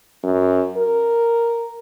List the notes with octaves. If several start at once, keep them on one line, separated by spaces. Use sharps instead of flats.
F#2
A#4